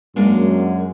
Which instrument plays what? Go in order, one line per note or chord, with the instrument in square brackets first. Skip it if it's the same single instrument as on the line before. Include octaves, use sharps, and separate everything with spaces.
[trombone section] F#2 [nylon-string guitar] G#3 A#3 D4